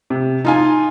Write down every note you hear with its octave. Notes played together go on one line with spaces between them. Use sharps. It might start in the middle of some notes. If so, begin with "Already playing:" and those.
C3
D#4 F4 G#5